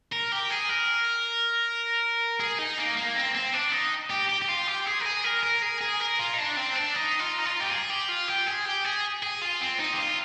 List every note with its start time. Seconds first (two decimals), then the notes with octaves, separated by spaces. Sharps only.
0.12 A#4
0.32 G4
0.50 G#4
0.69 A#4
2.40 G#4
2.59 D#4
2.78 A#3
2.97 A#3
3.15 C4
3.35 C4
3.54 D4
3.72 D#4
4.11 G4
4.29 G4
4.42 G4
4.49 F4
4.67 G4
4.86 G#4
5.00 A#4
5.05 G#4
5.24 A#4
5.43 A#4
5.62 G#4
5.81 G#4
6.00 A#4
6.19 F4
6.34 D#4
6.38 D4
6.57 C4
6.76 D4
6.95 D#4
7.20 F4
7.39 D#4
7.45 F4
7.60 G4
7.71 G#4
7.90 G4
8.09 F4
8.28 G4
8.47 G#4
8.65 G4
8.85 G#4
9.23 G#4
9.41 F4
9.61 C4
9.79 D#4
9.93 G4
9.98 F4